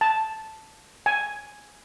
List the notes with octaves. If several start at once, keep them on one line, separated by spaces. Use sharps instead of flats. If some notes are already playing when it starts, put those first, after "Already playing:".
A5
G#5